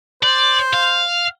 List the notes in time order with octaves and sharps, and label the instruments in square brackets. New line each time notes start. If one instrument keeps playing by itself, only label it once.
[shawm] C5 [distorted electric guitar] D5
[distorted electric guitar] F5